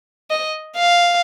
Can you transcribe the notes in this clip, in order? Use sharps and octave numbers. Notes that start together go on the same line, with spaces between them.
D#5
F5